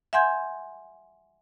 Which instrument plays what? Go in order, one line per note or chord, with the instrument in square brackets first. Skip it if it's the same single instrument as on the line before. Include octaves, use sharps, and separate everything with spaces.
[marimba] E5 F#5 G#5 C6 G6 G#6